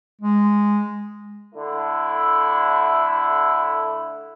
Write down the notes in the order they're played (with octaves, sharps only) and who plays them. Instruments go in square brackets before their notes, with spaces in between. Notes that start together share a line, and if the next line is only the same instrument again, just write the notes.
[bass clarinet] G#3
[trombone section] D3 A3 E4